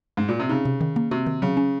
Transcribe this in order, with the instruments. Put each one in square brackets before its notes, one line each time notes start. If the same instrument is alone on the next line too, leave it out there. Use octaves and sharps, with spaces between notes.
[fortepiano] G#2
A#2
C3
[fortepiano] C#3 [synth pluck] D#4
[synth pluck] C3
D#3
A#3
[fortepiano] C3 [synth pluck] F#4
[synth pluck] D#3
[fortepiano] C#3 [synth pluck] F#3
[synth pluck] C#4